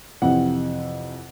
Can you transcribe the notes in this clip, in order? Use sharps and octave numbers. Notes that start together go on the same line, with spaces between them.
F2 C3 E3 F#5